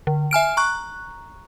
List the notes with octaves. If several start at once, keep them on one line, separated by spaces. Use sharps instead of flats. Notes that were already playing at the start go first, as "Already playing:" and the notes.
D3
E5 G#5 F6 D7
A#5 C#6 F#6